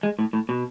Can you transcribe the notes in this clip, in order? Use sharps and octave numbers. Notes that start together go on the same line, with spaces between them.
G#3
A2
A2
B2